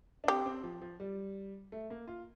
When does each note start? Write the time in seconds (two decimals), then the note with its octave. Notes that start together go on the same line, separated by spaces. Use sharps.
0.24 D4
0.28 C4 G4
0.46 C4
0.63 F3
0.82 F3
1.00 G3
1.72 A3
1.90 A#3
2.07 F4